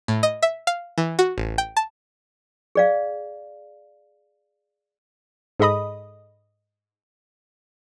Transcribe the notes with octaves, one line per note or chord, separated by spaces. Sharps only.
A2
D#5
E5
F5
E3
F#4
A1
G5
A5
G#4 D5 F5
G#2 G#4 A4 D#5 B5 D#6